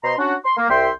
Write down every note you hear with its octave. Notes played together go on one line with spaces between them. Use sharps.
B2 C5 D#5 A#5 C6
C#4 D4 F#4
C6
A#3
C2 E5 G5 C6